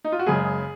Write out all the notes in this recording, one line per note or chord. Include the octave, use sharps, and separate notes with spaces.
D#4
F4
F#4
F#1 F#2 C#3 G#3 G#4